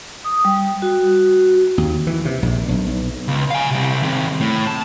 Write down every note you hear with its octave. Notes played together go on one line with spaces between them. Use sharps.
D#6
G3
F#4
D#2
E3
C3
A#1
B1
B1
C#2
F5 G#5
C3 G3
D#3 C4
A2
A5